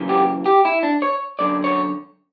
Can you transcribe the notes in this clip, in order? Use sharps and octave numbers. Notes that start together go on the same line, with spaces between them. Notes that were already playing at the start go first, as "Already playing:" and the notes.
Already playing: F#2 C#3 E3
G4
G4
E4
D4
C#5
F#2 D3 D5
C#5